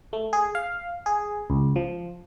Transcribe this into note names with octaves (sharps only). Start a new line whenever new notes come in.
A3
G#4
F5
G#4
C#2
F3